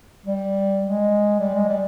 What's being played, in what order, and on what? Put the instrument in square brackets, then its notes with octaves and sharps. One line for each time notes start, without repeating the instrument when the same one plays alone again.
[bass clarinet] G3
G#3
G3
G#3
G3